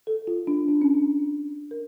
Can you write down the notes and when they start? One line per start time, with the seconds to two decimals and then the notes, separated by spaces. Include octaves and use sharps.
0.07 A4
0.27 F4
0.47 D4
0.68 D4
0.82 C#4
0.94 D4
1.71 A#4